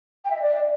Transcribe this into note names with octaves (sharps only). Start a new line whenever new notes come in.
G5
E5
D#5
D5